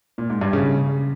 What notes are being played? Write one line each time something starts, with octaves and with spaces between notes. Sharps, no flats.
A#2
G#2
G2
C#3